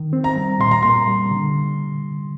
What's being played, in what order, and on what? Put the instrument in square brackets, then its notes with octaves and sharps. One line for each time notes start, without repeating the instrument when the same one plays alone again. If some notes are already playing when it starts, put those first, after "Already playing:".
Already playing: [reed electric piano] D#3
C4
[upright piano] A#5
[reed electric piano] G3
[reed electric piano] A#2 [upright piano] C6
[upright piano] A#5
[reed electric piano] A#3 [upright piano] C6
[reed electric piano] G3
D3